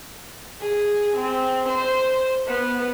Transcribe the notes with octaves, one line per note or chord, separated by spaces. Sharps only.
G#4
C4
C5
B3